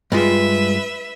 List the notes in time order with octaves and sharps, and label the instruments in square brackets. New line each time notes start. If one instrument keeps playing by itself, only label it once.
[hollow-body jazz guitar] G2 G#3 F4 [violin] B4 E5